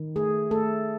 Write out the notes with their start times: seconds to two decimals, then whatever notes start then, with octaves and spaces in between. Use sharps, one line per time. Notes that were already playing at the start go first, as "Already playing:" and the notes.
Already playing: D#3
0.16 A3 G#4
0.51 A3 A4